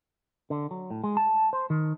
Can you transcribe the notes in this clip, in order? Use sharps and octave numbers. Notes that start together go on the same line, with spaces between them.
D3
F#3
A2
G#3
A5
C5
D#3